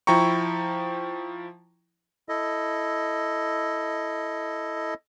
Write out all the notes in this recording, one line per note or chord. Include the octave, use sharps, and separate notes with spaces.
F3 E4 G5 A#5 C#6
E4 A4 D#5